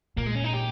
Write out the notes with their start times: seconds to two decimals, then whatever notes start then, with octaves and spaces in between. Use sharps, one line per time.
0.17 A#2 A#3
0.26 G#3
0.35 C#4
0.44 D#4
0.53 G4